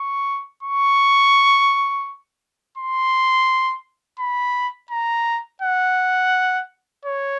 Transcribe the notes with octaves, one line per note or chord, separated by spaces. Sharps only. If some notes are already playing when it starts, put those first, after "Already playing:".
Already playing: C#6
C#6
C6
B5
A#5
F#5
C#5